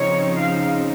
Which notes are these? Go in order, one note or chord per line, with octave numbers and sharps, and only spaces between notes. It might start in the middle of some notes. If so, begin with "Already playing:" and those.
Already playing: C#3 F3 C4 D#4 C#5
F5